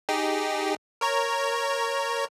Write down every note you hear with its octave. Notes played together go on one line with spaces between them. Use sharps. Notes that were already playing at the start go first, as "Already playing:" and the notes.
D#4 G4 G#4
A#4 C#5 A#5